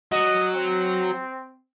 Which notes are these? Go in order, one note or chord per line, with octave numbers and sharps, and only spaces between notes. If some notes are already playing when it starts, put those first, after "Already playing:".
F#3 D#5
C4